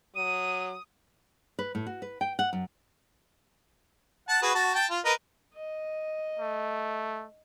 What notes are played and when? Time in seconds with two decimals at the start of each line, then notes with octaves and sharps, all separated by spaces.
0.16 F#3 D#6 D#7
1.59 B4
1.75 A2
1.87 F#4
2.02 B4
2.21 G5
2.39 F#5
2.53 F#2
4.28 F#5 A5
4.42 F#4 G#4 B4
4.55 F#4 A5
4.75 G5 A5
4.90 F4
5.05 A#4 B4 D#5
5.54 D#5
6.39 A3